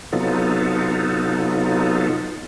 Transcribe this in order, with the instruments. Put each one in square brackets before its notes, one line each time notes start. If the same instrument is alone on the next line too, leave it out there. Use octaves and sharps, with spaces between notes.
[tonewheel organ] C3 F#3 B3 D#4 F4 A4